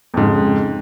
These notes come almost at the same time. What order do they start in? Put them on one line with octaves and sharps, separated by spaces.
F2 G#2 C#3